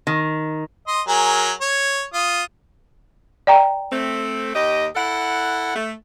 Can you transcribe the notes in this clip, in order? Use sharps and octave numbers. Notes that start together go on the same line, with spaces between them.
D#3
D#5 C6
F#3 G#4 A#4
C#5
F4 D#6
D5 G5 A#5
A3 C4
D#2 G4 D#5
E4 A4 F#5
A3